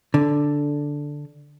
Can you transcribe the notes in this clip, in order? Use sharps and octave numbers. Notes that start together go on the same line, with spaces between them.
D3